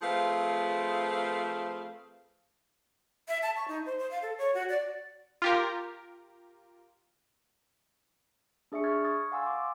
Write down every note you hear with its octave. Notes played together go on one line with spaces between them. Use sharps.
F3 A3 C4 G#4 B4 F5
E5
A5
C#6
D#4
C5
C5
F5
A4
C#5
F#4
D5
F4 G4 A#4
D4 G#4 E5 C#6 C#7
C#6 F6 G#6 A6
C#6 D#6 A6
F5 F#5 G#5 C6 E6
C6 D6